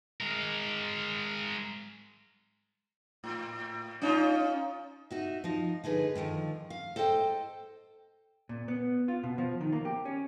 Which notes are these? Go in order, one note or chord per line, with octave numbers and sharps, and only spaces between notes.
G#3 A#4
A2
C#4 D#4 F4
D#4 F#4 E5
F3 D#4
D3 D#4 G#4 B4
A2 D3 D#3 F3
F5
A4 C5 D#5 F#5 G5
A#2
B3
F4
B2
F3
D#3
A#3
G4
C#4